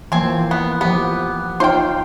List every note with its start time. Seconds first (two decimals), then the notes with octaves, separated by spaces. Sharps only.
0.12 E3 F3 A#3 C4 G#5
0.51 B3
0.81 F3 B3 G4
1.60 D#4 F4 C5 F5 G5